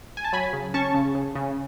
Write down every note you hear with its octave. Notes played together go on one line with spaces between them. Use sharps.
G#5
A5
F#3 G#5 B5
C#3
C#4 A5 C#6
C#3
C#3
C#3